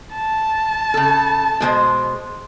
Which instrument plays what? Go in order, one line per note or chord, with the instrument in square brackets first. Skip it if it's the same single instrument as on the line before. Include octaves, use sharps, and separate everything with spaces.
[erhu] A5
[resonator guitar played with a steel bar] C#3 A4
B2 G#3 C5